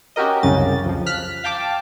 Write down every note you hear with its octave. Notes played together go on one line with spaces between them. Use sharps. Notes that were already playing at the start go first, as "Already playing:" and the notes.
C#4 F#4 G4 A#4 D#5
C2 F#2 C#3 A6
F2 F3
F6 F#6 B6
F5 G5 A5 D6